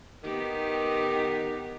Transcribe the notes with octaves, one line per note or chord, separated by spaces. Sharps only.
D#3 B3 D#4 G4